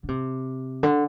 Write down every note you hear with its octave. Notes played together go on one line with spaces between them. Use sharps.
D3
C3
D3